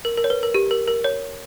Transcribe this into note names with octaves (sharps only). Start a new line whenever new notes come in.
A#4
A#4
C#5
B4
A#4
G4
A#4
A#4
C#5